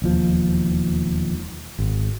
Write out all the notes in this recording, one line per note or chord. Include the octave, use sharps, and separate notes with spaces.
E1 D#2 F3
G#1